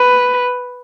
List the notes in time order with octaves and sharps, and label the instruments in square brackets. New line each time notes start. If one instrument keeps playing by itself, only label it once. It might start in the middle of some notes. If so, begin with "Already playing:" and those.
Already playing: [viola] B4